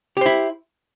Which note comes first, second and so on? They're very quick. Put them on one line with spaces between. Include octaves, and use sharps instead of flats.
G4 C5 E4